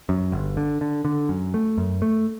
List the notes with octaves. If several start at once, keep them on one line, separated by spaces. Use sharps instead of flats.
F#2
G1
D3
D3
D3
F#2
A3
F#2
A3